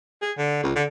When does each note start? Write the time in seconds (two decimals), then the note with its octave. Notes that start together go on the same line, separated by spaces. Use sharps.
0.22 G#4
0.38 D3
0.63 C#2
0.75 D3